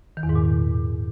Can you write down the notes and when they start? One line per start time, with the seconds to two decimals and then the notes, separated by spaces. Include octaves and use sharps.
0.17 D#3
0.23 E2
0.29 G#2
0.35 A#2